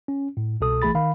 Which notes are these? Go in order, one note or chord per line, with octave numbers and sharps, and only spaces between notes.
C#4
A2
C2 B2 A4 D#6
A1 E3 A3 G#4 B5 A6
D#3 F5 B5